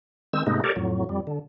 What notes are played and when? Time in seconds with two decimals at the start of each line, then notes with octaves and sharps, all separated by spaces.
0.33 D#3 G#3 C4 E6
0.46 G#2 C3 G#3 A3 B3 D#4
0.64 G4 A4 A#4 C#5 D5
0.76 F2 A2 F#3
1.09 F2 G3
1.27 D3